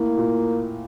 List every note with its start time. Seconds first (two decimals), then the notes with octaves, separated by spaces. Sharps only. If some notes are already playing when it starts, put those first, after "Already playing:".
Already playing: A2 A#3
0.17 A#2